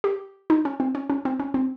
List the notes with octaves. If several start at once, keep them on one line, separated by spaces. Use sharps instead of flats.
G4
D#4
C#4
C4
C#4
C#4
C4
C#4
C4